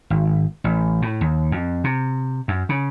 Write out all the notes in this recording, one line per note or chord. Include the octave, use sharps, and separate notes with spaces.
G#1
A1
A2
D#2
F2
C3
F#2
C#3